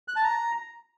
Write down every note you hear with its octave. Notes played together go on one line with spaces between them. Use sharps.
F#6
A5
A#5